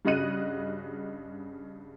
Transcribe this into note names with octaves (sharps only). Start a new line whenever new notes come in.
G2 C#3 F#4 D#5 F#6 D#7